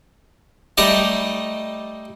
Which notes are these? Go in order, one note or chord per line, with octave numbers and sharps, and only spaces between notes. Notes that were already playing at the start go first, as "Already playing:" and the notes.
G3 A3 D#4 D5 D#5